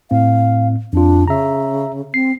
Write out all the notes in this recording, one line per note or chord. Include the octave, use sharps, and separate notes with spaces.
A2 C4 F5
F2 D4 F4
C#3 E5 A#5
C4 C7